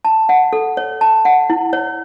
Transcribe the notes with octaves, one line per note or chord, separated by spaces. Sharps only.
A5
F#5
A4
C#5
A5
F#5
E4
C#5